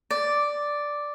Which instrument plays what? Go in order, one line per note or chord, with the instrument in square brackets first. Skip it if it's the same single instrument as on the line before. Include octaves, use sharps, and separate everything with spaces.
[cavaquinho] D5